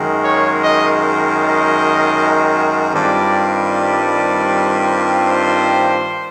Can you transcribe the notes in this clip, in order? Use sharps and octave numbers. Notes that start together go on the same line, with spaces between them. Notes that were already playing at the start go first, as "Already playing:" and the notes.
Already playing: F#2 D#3 G#3
C#5
D#5
D#5
G2 D#3 G3 C4 F4 D5
D5
C5